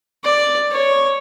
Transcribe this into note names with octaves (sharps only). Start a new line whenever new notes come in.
D5
C#5